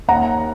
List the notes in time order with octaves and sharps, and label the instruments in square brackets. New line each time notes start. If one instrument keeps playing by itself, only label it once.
[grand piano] D#2 F#5 A#5